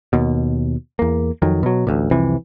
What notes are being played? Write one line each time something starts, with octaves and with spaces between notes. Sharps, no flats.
D#2 B2
E2 A#3
F2 D#3 F#3
B2 F#3
A1 D2 A#2
C2 F2 C3 E3